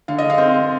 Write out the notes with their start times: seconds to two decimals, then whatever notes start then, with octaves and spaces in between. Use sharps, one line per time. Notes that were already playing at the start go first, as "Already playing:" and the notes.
0.08 D3 F5
0.18 D#5
0.30 F5
0.38 C4